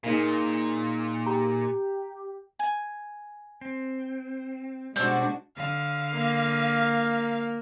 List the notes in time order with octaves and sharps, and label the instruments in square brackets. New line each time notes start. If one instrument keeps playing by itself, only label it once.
[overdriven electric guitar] A#2 [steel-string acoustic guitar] A#3 D#4 G#4
[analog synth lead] G4 [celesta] A#5
[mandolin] G#5
[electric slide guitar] C4
[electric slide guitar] B2 G3 [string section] G#3 D4 F#4 [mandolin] C5 D5 E6
[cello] D3 [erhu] F5
[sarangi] A#3